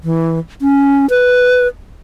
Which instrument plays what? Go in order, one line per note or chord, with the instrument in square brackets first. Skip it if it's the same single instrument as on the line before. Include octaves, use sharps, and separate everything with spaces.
[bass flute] E3
C#4
B4